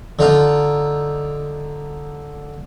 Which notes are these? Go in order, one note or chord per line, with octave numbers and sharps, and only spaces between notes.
D3 D#4 F4